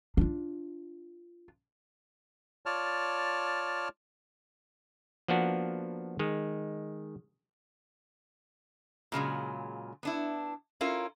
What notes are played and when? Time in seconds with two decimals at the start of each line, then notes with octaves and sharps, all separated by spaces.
0.17 D4 F4
2.66 F4 C#5 D5 A5 F6
5.28 F3 A#3 B3 D4 F#4
6.19 D#3 G#3
9.12 A#2 C#3 F#3 G#3
10.03 B3 D4 E4
10.81 C#4 E4 F4 A#4